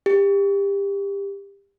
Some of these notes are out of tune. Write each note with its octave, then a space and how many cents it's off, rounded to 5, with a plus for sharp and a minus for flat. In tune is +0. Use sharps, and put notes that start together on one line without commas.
G4 +25